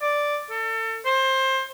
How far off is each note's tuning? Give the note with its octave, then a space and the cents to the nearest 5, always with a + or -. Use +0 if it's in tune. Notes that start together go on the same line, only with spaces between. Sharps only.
D5 +0
A4 +35
C5 +20